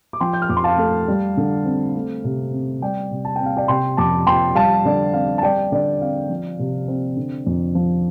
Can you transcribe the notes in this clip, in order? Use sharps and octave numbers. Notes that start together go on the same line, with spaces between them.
D6
F3 G5 C6
G6
F6
F2 D6
C6
F5 A5
A3
G3
D3
C4
A3
C3
C4
G3 D5 G5
C3
A5
C4 G5
F5
D5 G5
C3 G5 C6
F2 A5 D6
F3 G5 C6
G3 F5 A5
D3 D5
C4 F5
A5
G3 D5 G5
D3 D5
C4 F5
F3
C3
C4
D3
F2
F3